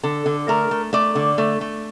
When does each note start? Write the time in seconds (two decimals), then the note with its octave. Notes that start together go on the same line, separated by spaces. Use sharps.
0.03 D3 A4
0.26 D3
0.48 A3 A#4
0.71 A3
0.93 A3 D5
1.15 D3
1.38 A3
1.61 A3